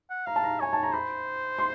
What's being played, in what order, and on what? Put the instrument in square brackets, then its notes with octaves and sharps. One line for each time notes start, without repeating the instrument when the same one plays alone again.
[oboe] F#5
[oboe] F5 [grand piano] A#5
[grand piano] A5
A#5
[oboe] C#5 [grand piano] G#5
[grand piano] A5
A#5
[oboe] C5 [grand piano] B5
[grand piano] C6